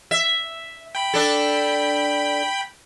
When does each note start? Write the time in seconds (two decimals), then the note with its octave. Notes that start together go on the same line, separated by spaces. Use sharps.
0.11 E5
0.95 G5 B5
1.14 D4 A4